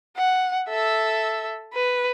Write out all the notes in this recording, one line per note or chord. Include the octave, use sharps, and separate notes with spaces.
F#5
A4 E5
B4